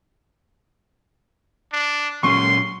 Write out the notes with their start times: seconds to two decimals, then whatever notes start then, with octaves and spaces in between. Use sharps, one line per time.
1.73 D4
2.23 A#2 F#3 C#4 C6 C#6